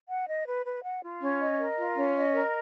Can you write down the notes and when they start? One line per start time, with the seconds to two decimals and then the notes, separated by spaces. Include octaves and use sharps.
0.09 F#5
0.27 D#5
0.46 B4
0.66 B4
0.84 F#5
1.02 F4
1.21 C#4
1.40 D#5
1.59 A#4
1.78 F4
1.96 C#4
2.15 D#5
2.34 A#4